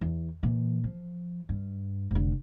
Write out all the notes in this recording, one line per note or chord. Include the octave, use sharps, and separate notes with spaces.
E2
A#2 E3
F3
G2
F1 D3